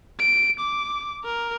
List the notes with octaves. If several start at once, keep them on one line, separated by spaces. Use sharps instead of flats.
D7
D6
A#4